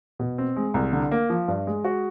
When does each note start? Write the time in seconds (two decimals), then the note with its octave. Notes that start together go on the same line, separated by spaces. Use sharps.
0.19 B2
0.38 C4
0.56 G#3
0.74 C2
0.93 D3
1.11 A#3
1.30 F3
1.48 G2
1.67 G#3
1.84 F#4